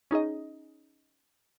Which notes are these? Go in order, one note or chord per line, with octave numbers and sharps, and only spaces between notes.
C#4 D#4 G#4 D#5